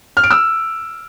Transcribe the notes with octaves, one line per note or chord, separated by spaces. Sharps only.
F6
D7
E6